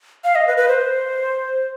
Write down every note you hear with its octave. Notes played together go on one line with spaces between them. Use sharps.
F5
D#5
B4
B4
C5